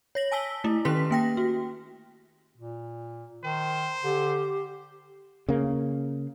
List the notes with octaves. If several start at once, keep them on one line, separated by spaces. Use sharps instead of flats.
C#5 A#6 F#7
G#5 A5 E6 B6 G7
A3 E4
D#3 C#4 G4 B4 C6 B6
A#3 G5 A#6
F#4
A#2
D#3 C5
D3 G4
C#3 A#3